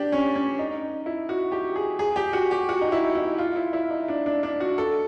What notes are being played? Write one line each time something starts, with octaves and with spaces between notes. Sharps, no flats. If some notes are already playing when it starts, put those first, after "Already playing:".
Already playing: D4 G4
C#4
C#4
D#4
E4
F#4
G4
G#4
G#4
G4
F#4
G4
F#4
D#4
E4
E4
F4
E4
E4
D#4
D4
D4
D4
F#4
A4